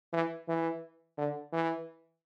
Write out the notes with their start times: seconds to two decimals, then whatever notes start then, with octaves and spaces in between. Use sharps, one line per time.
0.13 E3
0.48 E3
1.18 D3
1.53 E3